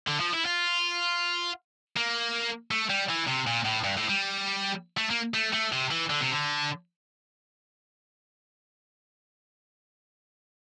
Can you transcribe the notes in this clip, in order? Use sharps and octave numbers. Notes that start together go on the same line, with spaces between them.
D3
F3
E4
F4
A#3
A3
G3
E3
C3
A#2
A2
G2
A2
G3
A3
A#3
A3
A3
C3
E3
D3
C3
D3